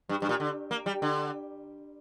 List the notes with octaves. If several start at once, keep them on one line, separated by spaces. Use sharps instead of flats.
G2
G2
A#2
D3
A#3
G3
D3